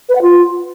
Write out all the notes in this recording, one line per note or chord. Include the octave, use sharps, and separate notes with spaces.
B4
F#5
F4